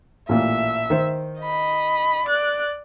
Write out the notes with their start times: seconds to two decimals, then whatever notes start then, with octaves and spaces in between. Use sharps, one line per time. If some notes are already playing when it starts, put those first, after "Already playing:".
0.29 A1 A#2 E5
0.90 D#3 C5
1.41 D#5 B5
2.26 D5 F#6